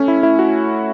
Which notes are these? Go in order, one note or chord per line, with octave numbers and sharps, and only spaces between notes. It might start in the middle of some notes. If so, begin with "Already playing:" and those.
Already playing: A3 C#4
E4
E4
F#4